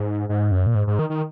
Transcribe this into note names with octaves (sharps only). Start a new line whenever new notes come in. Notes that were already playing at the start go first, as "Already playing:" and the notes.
Already playing: G#2
G#2
F#2
A#2
G#2
G#2
D#3
D#3